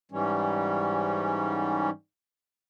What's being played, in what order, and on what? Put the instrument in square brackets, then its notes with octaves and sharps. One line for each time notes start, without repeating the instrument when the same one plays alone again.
[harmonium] G#2 E3 G3 C#4